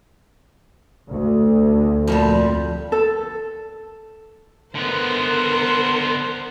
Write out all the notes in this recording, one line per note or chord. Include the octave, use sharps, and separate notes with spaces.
D2
F2 A#2 G3
A4
D3 B3 A#4 C5